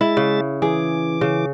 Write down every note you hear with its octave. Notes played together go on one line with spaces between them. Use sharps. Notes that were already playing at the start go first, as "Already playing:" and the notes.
G#3 E4 E5 A6
C#3
E3 G#4 D6
C#3